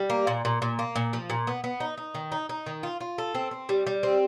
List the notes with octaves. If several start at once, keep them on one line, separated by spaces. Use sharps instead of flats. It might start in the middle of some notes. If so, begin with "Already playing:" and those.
Already playing: G3
A#3
A#2
A#2
A#2
A#3
A#2
F3
A#2
B3
B3
D#4
D#4
D#3
D#4
D#4
D#3
F4
F4
A4
C4
C4
G3
G3
C4